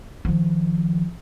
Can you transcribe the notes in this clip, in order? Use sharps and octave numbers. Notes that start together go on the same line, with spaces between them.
D#3 F3